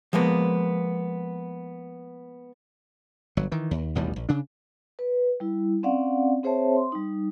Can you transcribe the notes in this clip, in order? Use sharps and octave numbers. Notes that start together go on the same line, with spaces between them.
F3 G#3 A#3 B3
G1 F#3
D#3 E3
D#2
A1 D#2 B2 G3
A#1
C#3 D4
B4
G3 E4
C4 C#4 D5 F5 F#5
C4 G#4 C5 C#5 E5 A5
C6
G3 D#4